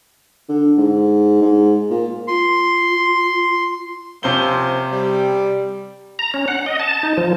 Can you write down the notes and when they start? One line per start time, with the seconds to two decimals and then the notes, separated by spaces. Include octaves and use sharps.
0.49 D3
0.78 G#2
1.42 G#2
1.90 A#2
2.28 F4 C6
4.23 C3 F3 A#3 C#4 C5 G7
4.92 G3
6.19 A#5
6.34 C#4
6.48 F#5
6.66 D#5
6.80 A5
7.03 D#4
7.17 F3